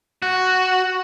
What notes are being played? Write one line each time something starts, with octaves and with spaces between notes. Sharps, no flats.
F#4